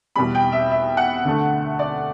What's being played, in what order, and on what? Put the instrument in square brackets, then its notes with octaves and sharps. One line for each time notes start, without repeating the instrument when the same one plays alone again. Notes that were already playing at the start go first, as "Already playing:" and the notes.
[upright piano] E2 B2 G3 B5
G5
E5
E5
F#5
D2 D3 A3
D5